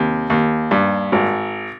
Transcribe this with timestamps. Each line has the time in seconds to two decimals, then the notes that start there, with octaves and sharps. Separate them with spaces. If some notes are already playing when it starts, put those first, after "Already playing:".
Already playing: D#2 C3
0.30 D#2
0.71 G2
1.12 G#1